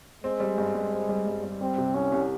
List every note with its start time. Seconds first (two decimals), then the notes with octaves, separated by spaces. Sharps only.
0.24 G#3 C4
0.40 G3
0.58 G2
0.75 G2
0.93 C4
1.09 G3
1.27 G2
1.43 G2
1.61 G3 C4
1.78 C3
1.94 C2 C#4
2.12 C2